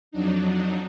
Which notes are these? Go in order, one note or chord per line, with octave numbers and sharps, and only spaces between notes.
F2 F#3 D4 D#4